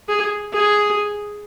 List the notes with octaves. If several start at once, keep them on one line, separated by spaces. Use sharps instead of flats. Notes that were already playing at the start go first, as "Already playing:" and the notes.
G#4
G#4